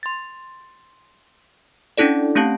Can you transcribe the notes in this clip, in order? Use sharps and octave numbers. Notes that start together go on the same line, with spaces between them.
C6 A6
C#4 D4 E4 A4 D5
A3 C4 C#4 G4 F5 A5